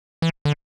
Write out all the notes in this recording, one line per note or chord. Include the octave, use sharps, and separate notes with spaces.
E3
D3